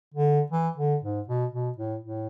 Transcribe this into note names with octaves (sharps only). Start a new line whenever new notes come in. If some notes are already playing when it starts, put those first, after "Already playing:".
D3
E3
D3
G#2
B2
B2
A2
A2